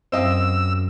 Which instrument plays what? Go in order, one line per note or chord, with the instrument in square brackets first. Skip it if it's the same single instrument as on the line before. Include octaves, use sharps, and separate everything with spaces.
[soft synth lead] F#2 [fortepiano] C4 D#5 F5 [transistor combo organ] E6